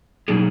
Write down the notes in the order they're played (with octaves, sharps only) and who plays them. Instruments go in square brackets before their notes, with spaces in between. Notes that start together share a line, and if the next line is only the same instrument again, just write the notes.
[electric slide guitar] B2 F#3 A#3 D#4 G#4